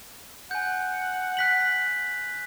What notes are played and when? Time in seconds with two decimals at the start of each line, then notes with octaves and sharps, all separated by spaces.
0.51 F#5 G#5 G6
1.37 F#6 B6 F#7